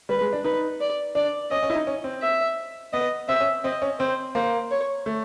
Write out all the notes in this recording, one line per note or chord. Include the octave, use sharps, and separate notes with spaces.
G3 B4
G#3
D4
D#4 B4
D5
D4 D5
C#4 D#5
C#4
E4
D#4
C#4
C4
E5
B3 D#5
C4 E5
C#4
C4 D#5
C#4
C4 C5
A#3 C5
C#5
A3